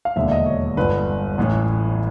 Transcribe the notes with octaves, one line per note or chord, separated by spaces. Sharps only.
F5
E1 D#2 D3 E5
D#5
C#5
G1 G2 D3 B4
A1 A2 E3